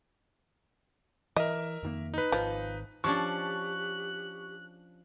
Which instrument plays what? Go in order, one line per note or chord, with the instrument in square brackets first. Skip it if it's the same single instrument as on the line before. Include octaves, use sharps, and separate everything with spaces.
[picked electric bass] E3 [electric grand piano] A#4 E5 [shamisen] D#5
[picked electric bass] F2 D#3 A#3
[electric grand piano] D#4 B4
[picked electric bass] G#1 D#3 [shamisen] F3
[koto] F3 C#4 D4 [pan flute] G4 [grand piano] C#6 [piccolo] F#6